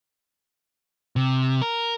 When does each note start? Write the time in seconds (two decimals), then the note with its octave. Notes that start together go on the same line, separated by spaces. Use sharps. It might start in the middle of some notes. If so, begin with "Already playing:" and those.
1.16 C3
1.62 A#4